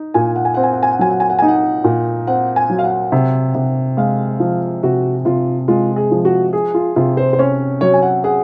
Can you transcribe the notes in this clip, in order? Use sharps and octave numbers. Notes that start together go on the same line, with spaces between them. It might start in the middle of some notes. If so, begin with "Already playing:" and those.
Already playing: D#4
A#2 G#5
F#5
G#5
C4 F#5
G#5
F#5
G#5
F#5
F#3 G#5
F#5
G#5
F#5
D#4 G#5
F#5
A#2
C4 F#5
G#5
F#3
F5
F#5
C3
C3
G#3 F5
F3
C3 F#4
C3 F4
G#3 F4
G#4
F3
F#4
G#4
F4
C3 F4
C5
C5
C#4 C#5
F#3 C#5
G#5
F#5
G#4 F#5